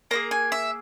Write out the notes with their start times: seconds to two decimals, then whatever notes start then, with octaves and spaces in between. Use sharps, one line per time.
0.11 A#3 E4 G#4 A#5
0.31 G#5
0.52 E5